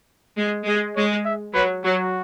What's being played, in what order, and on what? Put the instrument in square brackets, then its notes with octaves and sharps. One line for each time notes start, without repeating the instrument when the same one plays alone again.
[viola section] G#3
G#3
[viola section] G#3 [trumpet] C#5
[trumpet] E5
[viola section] F#3 [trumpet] B4
[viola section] F#3 [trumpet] F#4